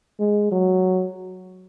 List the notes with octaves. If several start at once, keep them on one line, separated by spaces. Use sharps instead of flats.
G#3
F#3